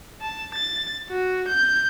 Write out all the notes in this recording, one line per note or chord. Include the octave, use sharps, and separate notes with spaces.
A5
A6
F#4
G6